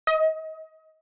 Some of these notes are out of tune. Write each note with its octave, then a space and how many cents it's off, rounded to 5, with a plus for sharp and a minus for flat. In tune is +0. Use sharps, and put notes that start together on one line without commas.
D#5 +30